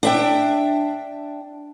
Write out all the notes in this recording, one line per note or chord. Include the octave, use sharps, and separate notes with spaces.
D4 E5 G5